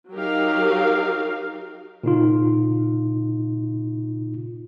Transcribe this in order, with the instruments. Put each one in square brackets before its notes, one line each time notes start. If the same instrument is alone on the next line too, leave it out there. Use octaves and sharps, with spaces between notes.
[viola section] F#3 D#4 G4 A#4 F5
[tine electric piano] A#2 C#3 D#4 F4